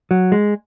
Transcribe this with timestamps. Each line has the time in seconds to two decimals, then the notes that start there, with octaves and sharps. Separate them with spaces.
0.11 F#3
0.32 G#3